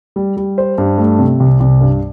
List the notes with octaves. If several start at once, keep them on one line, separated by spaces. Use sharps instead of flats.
G3
G3
C5
G2
A3
C3
C2
C2
G2